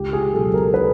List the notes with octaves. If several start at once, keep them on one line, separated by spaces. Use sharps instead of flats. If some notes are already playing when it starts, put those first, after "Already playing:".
Already playing: C#2 G4
G#4
B2 F#3 A4
A#4
B4